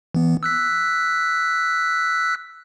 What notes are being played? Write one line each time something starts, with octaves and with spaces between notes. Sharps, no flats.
E3 B3
E6 F#6 B6